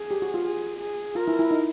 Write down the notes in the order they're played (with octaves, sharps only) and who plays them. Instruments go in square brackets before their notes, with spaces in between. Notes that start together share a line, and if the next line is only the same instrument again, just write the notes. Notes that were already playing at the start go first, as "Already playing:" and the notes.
Already playing: [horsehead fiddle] G#4
[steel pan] G4
F#4
F4
[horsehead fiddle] G#4
G#4
[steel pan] F4 [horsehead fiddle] A#4
[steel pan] E4
E4
D#4